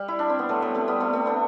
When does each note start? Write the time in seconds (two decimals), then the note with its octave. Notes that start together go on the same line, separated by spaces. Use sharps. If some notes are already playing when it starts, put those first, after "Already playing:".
Already playing: G3
0.08 E4
0.19 D4
0.29 C4
0.39 B3
0.49 F#3 A3
0.62 G3 B3
0.75 A3 C4
0.88 G3 B3
1.00 A3 C4
1.13 A3 C4
1.26 B3 D4